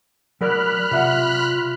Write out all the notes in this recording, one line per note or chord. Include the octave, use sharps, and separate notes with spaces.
F#3 A#4 D5 B5 F6 F#6
C3 F4 E5 F#5